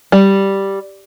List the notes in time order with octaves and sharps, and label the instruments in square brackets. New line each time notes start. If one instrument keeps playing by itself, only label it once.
[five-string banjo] G3